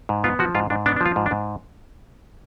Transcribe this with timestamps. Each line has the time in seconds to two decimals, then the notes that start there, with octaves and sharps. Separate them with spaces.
0.09 G#2
0.24 B3 F4
0.39 F3 F#4
0.55 G#2 F4
0.70 G#2 D4
0.86 B3 D4
0.96 D4
1.01 F3 F4
1.16 G#2
1.26 D4
1.31 G#2